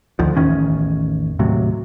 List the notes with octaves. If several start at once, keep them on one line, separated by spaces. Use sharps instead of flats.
D2 D#3 F3
A1 E2 D#3 C#4
D#2 A2 C3 F#3